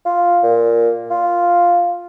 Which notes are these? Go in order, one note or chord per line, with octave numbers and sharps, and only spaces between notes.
F4
A#2
F4